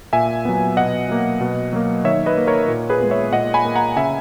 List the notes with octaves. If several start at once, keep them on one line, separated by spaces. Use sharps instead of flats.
A#2 E5 G#5
F#3 B3
B2 D#5 F#5
F#3 A#3
B2
F#3 A#3
D#3 C#5 E5
B4 D#5
A#3
A#4 C#5
A#2
G#4 B4
G#3 B3
C#5 E5
A#2 D#5 F#5
G#5 B5
A#3
F#5 A#5
C#3 E5 G#5